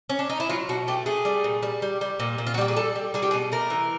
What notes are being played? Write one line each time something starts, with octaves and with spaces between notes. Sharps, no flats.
C#4
D4
D#4
E4
F#3 F4
B2 F#4
A3 G4
A3 G#4
G3
A#2
G3
G3
G3
A#2
A#2
F4
F#4
G3 G4
G#4
G3 A4
G3
G3 G#4
G4
G#4
B2
A3 A#4
E3